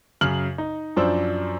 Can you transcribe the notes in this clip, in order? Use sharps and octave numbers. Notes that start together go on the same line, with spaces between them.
F#2 C#3 F6 F#7
D#4
F#2 F3 D4 C5 E6